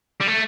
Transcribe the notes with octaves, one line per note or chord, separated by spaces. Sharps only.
G3
A3